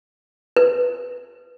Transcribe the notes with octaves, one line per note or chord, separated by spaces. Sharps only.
B4